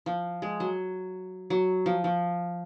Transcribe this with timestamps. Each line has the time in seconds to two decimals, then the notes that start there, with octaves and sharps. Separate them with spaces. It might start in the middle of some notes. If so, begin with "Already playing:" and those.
0.06 F3
0.42 G#3
0.60 F#3
1.50 F#3
1.86 F3
2.04 F3